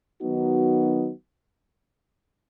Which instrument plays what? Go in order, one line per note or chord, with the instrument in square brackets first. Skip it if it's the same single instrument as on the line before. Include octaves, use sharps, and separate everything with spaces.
[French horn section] D#3 F#3 B3 D#4 F#4